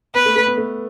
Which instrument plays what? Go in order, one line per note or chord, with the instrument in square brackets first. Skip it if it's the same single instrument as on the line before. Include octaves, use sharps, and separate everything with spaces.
[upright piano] B3 [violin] B4
[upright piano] A3
A3
B3
A3